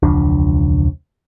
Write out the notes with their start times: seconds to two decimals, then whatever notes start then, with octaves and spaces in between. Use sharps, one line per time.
0.03 E1 C#2 F3 D4